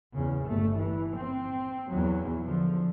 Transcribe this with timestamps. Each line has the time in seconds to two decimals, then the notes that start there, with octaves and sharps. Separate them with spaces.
0.14 E2 C#3
0.45 G1 A3
0.77 E3
1.16 C4
1.89 E2 F#3
2.45 D3 F3